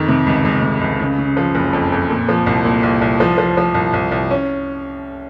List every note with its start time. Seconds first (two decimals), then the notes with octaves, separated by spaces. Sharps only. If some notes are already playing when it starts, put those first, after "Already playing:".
Already playing: F2 D#3
0.08 C3
0.26 C#2
0.45 C#2
0.62 C3
0.81 C#2
1.00 C#3
1.18 C#3
1.37 F3
1.55 F#1
1.73 F2
1.92 F2
2.10 A#2
2.29 F3
2.46 C2
2.65 A#2
2.83 C2
3.01 C2
3.20 F3
3.38 F3
3.57 F3
3.74 C2
3.93 C2
4.12 C2
4.31 C#4